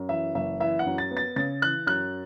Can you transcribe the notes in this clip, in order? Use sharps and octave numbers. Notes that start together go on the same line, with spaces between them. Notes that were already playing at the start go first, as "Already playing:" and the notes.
Already playing: F#2
E3 E5
F#1 E5
E3 E5
F#5
F#2
A6
B3
A6
C#3 A6
E3 F#6
F#2 F#6